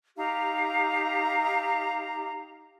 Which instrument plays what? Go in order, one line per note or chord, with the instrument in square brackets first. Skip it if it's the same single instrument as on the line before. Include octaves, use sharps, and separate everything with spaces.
[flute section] D#4 G4 F5 A#5